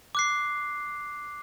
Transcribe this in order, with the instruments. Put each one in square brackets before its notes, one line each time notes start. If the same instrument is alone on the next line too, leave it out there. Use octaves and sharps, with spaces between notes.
[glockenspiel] D6 F#6 C7